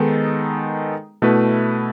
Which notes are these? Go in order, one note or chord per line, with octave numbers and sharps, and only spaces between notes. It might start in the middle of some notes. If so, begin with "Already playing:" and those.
Already playing: D#3 G#3 B3 D#4 A4
B2 A3 E4 B4